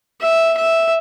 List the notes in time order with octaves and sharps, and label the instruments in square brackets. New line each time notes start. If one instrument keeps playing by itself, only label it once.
[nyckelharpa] E5
E5